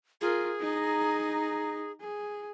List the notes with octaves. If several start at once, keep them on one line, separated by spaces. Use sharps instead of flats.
F4 G#4 A#4
D#4 A#5
G#4